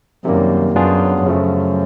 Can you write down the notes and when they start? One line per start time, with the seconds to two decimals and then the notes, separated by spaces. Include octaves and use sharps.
0.25 F#2 C3 D#3 G3 A#3
0.75 F#2 F#3 B3 D4 F4 G#4
1.26 F#2 C#3 F3 A3